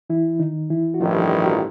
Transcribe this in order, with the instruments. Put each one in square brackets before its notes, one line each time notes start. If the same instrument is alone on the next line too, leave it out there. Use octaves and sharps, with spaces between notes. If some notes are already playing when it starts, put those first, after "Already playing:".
[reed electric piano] E3 E4
D#3 D#4
E3 E4
F#4
[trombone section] A1 G2 D#3 [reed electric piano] F3 F4
[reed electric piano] F#4
F4